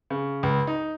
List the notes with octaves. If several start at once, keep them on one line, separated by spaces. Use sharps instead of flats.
C#3
C#2
D#4